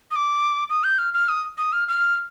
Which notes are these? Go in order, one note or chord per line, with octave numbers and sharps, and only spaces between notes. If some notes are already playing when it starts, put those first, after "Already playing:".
D#6
D6
D#6
G6
F6
F6
D#6
D#6
F6
F6